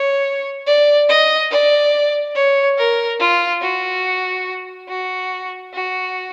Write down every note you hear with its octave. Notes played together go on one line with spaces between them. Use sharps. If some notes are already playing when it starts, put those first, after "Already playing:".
Already playing: C#5
D5
D#5
D5
C#5
A#4
F4
F#4
F#4
F#4